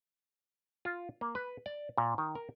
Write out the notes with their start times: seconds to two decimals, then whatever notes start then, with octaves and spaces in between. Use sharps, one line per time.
0.85 F4
1.21 A#3
1.35 B4
1.66 D5
1.98 A#2
2.18 D#3
2.35 A#4